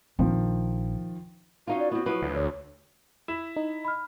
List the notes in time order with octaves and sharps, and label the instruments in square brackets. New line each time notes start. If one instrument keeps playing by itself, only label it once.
[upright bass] A#1 [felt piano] D#3 F3
[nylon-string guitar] C#4 D#4 F4 [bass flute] F#4 [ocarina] F5
[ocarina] D5
[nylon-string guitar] B3 C4 [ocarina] E4
[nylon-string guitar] F3 F#3 B4 [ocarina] E4
[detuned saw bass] D2
[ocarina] C#5
[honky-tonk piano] E4 [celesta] E7
[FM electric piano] D#4
[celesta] B5 F6